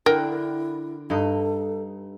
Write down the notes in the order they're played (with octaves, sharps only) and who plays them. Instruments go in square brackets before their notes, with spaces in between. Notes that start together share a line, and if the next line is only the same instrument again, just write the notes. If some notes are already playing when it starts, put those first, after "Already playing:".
[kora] D3 F#5 [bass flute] E4 [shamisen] A#4 G5
[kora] G2 D#4 D#5 [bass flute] A4